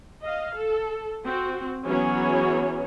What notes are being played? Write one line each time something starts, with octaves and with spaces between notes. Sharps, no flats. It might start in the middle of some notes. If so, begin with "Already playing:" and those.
D#5 F5
A4
C4 F#4
E3 F#3 B3 C#4 G#4 C#5